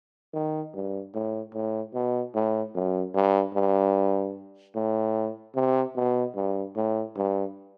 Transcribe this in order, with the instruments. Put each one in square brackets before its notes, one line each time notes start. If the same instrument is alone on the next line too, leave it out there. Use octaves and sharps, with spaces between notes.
[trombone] D#3
G2
A2
A2
B2
A2
F#2
G2
G2
A2
C3
B2
G2
A2
G2